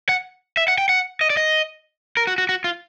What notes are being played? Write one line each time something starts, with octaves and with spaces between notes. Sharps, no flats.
F#5
E5
F#5
G5
F#5
D#5
D5
D#5
A#4
F#4
F#4
F#4
F4